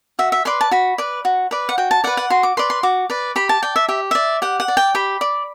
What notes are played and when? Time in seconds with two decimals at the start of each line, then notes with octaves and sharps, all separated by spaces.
0.19 F#4 E5
0.32 E5
0.45 B4 D5 C6
0.61 A5
0.71 F#4 B5
0.98 B4 D5
1.25 F#4
1.51 B4 D5
1.69 F#5
1.78 F#4 G5
1.91 A5
2.04 B4 D5 F#5
2.17 F#5
2.30 F#4 C6
2.43 D6
2.57 B4 D5 C6
2.70 C6
2.83 F#4 D6
3.10 B4 D5
3.36 G4 B5
3.49 A5
3.63 D5 G5
3.76 E5
3.88 G4 E5
4.11 D5 E5
4.42 G4 F#5
4.60 F#5
4.68 D5
4.77 G5
4.95 G4 B5
5.21 D5